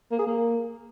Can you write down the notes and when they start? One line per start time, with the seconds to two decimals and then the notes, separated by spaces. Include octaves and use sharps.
0.11 A#3
0.19 G#4
0.27 A#3